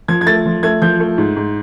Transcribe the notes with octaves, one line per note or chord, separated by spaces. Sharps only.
F3 G#6
G#6
A3 A6
F3
A3 G#6
F3 G6
A3
G#2
G#2